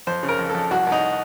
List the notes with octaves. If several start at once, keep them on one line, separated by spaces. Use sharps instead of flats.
F2 C5
C#3
A#4
F2
F2 A4
C2 F#4
C2
D#4